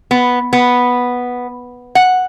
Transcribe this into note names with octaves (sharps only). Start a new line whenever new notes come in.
B3
B3
F#5